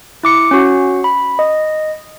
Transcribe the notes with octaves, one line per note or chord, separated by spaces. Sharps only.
E4 D6 C#7
C#4 F#4
B5
D#5